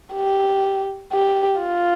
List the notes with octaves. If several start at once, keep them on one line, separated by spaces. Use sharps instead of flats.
G4
G4
F4